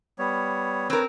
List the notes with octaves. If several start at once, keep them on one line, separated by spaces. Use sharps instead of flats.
G3 B3 C#5
C4 A#4 B4 C#5